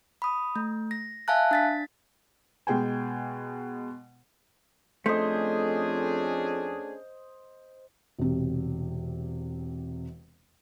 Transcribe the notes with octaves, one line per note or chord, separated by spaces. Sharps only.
B5 D#6
A3
A#6
E5 F5 G#5 A5 F#6
D4 A6 B6
B2 G#3 G5 G#5
F2 A3 C#4 D4 G#4 C5 D#5
E1 C3